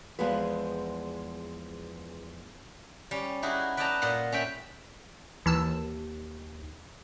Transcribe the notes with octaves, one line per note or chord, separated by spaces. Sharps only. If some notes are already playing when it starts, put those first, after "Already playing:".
E2 F3 G#3 B3 B4
G3 C#4
D#4 E4 F#4 G#4
B4 D5 D#5 G5 A5 A#5
A#2 D#5 F#5 C6
C#4 E5 G5 B5
D#2 E3 A5 E6